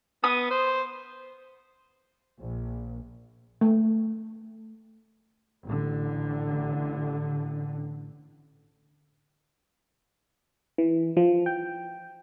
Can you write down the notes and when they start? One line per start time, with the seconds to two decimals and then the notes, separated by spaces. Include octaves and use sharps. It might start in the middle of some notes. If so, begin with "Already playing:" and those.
0.24 B3 D#6
0.50 C5
2.40 A#1
3.61 A3
5.66 A1 D3
10.78 E3
11.17 F3
11.46 G5